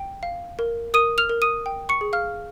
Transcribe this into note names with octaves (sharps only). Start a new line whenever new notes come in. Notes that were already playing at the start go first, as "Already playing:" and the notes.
Already playing: G5
F5
A#4
A#4 D#6 D#7
F6 F7
A#4
D#6 D#7
G5
C#6 C#7
G#4
F5 F6